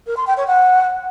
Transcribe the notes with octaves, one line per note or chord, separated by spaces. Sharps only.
A#4
C6
G5
C#5
F#5